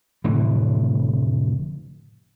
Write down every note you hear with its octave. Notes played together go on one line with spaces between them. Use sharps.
F1 A2 D3 E3